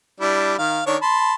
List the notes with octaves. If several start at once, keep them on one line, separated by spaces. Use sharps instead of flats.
G3 D4 E4
D#3 F5
D#3 D4 C#5
A5 B5 C6